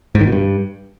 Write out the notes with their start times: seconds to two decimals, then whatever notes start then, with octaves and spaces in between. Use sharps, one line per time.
0.15 G#2
0.21 D#3
0.27 B2
0.32 G2